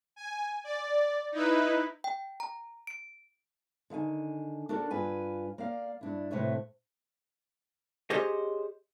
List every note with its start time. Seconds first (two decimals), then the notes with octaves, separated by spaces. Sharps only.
0.16 G#5
0.64 D5
1.32 D#4 E4 B4
2.04 G5
2.40 A#5
2.87 D7
3.90 D3 D#3 F5 G#5
4.69 D4 F#4 A4 A#4 D5
4.91 G2 F4 B4 G#5
5.58 A#3 D5 F5
6.01 G2 D4 E4
6.31 A2 C3 A3 B4 C#5 E5
8.10 G4 G#4 C5 C#5 D#5